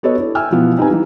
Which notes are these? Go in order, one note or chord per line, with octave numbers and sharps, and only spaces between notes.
B3 F#4 A4 B4 C#5 D#5
D4 E4
E5 G5 G#5 E6 F6
B2 E3 F3 B3
C4 D#4 G4 B4 G#5
E3 G3 D#4